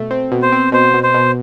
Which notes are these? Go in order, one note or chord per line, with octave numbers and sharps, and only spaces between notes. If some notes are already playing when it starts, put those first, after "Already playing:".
Already playing: B2 A3
C4
B2
C5
C4
B2 C5
B2
C5
B2